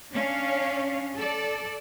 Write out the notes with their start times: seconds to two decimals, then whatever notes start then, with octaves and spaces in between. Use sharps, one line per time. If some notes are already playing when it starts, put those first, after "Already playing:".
0.13 C#4 D4 C#5 F5
1.17 A4 D5